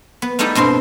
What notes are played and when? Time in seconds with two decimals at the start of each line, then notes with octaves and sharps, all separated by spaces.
0.22 B3
0.39 G3 A3 B3 D#4 E4 G4
0.55 G2 B2 C4 C6